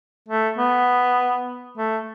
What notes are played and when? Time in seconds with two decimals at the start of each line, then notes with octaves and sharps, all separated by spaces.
0.28 A3
0.58 B3
1.77 A3